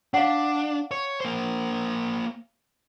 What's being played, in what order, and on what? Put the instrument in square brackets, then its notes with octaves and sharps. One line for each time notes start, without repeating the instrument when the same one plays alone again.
[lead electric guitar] D4 [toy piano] F5 F#5
[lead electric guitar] C#5
A#3 C5